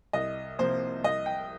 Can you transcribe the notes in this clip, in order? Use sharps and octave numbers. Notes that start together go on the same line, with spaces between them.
C2 D#5
C3 F3 A#3 C5
C2 D#5
G5